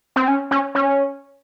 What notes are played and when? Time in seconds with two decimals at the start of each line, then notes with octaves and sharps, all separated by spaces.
0.16 C4
0.28 C#4
0.51 C#4
0.75 C#4